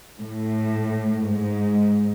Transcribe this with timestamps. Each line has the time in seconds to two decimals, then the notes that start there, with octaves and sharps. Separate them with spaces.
0.19 A2
1.34 G#2